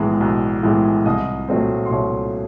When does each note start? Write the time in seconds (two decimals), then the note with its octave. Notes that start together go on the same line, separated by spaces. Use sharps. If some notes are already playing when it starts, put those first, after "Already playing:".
Already playing: B1 A2 E3 G#3 B3
0.20 B1
0.63 A2 E3 G#3 B3
1.05 C2 D#5 D#6
1.48 A#2 F#3 A3 C4
1.86 C6
1.91 C2 C#5 C#6